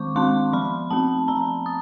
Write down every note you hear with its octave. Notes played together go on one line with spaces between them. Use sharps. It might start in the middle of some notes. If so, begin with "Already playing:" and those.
Already playing: D#3 G#3 C4 C#6 D6
G#3 C4 C6
F3 B5
A3 C4 A5
F3 A#5
D#6